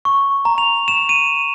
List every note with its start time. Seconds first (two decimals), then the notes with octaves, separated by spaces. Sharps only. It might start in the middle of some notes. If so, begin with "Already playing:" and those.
0.05 C#6
0.45 A#5
0.58 F7
0.88 E7
1.09 D#7